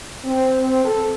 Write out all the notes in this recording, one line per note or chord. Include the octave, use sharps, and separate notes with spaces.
C4
A4